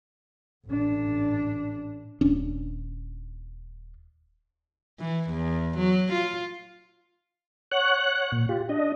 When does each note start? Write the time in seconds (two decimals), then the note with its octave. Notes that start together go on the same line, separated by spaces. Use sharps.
0.67 A1 D4
2.21 D#1 C#4 D4
4.99 E3
5.30 E2
5.78 F#3
6.13 F4
7.71 C#5 F#5 F#6
8.32 A#2
8.49 F4 G4
8.69 D4 D#5